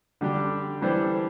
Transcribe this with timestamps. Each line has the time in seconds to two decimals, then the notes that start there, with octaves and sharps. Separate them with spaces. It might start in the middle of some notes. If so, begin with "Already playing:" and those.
0.21 D3 G3 D4 G4
0.81 E3 G3 D4 A4 C5